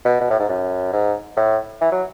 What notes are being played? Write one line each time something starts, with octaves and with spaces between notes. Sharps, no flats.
B2
B2
A2
G#2
F#2
G#2
A2
E3
F#3